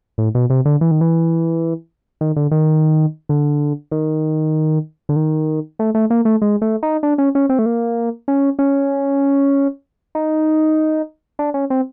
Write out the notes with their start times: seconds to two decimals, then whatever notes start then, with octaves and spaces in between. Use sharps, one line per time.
0.18 A2
0.35 B2
0.50 C3
0.65 D3
0.81 E3
0.91 D#3
1.01 E3
2.21 D#3
2.36 D3
2.51 D#3
3.29 D3
3.92 D#3
5.09 D3
5.16 D#3
5.79 A3
5.95 A3
6.10 A#3
6.25 A3
6.42 G#3
6.62 A3
6.83 D#4
7.03 D4
7.18 C#4
7.35 C#4
7.49 C4
7.59 A3
7.66 A#3
8.28 C#4
8.59 C#4
10.15 D#4
11.39 D4
11.54 C#4
11.70 C4